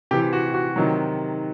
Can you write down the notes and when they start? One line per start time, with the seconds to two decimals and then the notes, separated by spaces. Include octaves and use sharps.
0.11 C3 E3 G4
0.33 F#4
0.54 F#4
0.76 C3 D#3 F#3